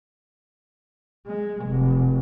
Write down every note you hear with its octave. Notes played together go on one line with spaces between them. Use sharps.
G#3
F1